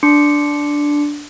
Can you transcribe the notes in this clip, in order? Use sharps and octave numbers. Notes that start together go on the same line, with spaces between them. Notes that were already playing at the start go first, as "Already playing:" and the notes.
D4 C6 D6 C#7